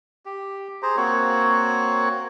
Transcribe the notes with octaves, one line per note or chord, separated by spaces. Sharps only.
G4
G#4 C5 A#5
A#3 C4 F#4 C#5